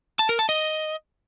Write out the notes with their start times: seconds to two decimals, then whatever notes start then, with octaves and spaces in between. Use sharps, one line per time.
0.19 A5
0.29 A#4
0.39 A5
0.49 D#5